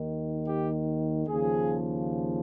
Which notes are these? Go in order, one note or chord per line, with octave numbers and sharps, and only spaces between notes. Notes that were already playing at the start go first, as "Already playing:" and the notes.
Already playing: D#2 D#3
G4
D#2 C#3 F3 G#4